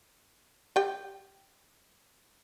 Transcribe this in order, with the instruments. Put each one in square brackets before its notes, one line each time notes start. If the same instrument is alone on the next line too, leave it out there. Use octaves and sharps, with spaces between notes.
[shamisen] G4 G5